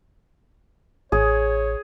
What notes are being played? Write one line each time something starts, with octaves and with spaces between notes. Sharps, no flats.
A1 G#4 C#5